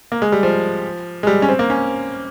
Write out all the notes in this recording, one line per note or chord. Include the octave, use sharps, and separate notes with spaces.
A#3
G#3
G3
F3
G#3
G3
C#4
C4
A#3
C#4